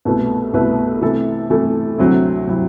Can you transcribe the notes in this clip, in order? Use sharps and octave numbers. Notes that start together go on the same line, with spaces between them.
C2 B2 A3 E4 B4
C2 B2 A3 E4 B4
C3 E3 A3 E4 A4
C3 E3 A3 E4 A4
D2 C3 F#3 C4 E4
C3 F#3 C4 E4